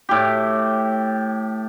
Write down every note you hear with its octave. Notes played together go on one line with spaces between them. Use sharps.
A2 G4